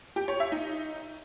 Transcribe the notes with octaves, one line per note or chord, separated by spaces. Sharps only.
G4
C#5
E5
D#4